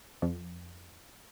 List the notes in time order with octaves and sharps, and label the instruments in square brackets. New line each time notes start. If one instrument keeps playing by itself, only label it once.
[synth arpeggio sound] F2